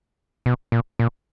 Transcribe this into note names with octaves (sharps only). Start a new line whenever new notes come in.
B2
A#2
A#2